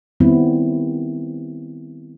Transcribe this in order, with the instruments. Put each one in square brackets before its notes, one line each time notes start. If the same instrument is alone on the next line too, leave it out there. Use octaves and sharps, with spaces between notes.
[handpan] D#3 G3 B3 C4 E4